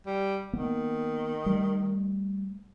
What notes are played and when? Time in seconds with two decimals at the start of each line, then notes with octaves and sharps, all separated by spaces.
0.06 G3
0.53 D#3 A#3 B3
1.46 G3 A3